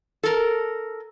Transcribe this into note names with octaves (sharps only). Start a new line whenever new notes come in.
A4 A#4